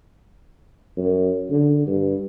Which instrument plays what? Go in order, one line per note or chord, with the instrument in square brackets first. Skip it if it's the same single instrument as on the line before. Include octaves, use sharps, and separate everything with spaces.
[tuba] F#2
D3
G2